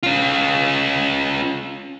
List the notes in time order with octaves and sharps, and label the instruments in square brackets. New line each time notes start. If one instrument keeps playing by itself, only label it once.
[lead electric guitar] C#4 F4